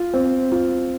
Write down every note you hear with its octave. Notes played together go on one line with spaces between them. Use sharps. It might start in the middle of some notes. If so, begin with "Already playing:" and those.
Already playing: F4
C4
F4